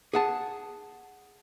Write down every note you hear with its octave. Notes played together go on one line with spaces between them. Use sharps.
G#4 F#5 A5